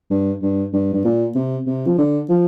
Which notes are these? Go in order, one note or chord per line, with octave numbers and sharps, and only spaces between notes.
G2
G2
G2
G2
A#2
C3
C3
F3
D3
F3